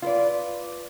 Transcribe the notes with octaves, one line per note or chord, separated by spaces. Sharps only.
F4 B4 D5